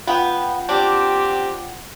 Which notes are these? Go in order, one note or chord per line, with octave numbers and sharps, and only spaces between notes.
B3 F4 F#5 G5
C4 D4 G4